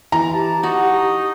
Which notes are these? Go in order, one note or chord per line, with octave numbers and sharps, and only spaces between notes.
E3 A#5
G4 A5
D#4 F#4